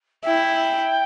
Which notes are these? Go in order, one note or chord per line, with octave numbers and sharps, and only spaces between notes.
E4 G5